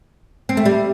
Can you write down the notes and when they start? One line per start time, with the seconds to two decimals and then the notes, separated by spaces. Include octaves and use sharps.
0.49 C4
0.57 A3
0.65 G3